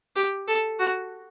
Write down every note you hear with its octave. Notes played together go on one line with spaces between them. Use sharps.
G4
A4
F#4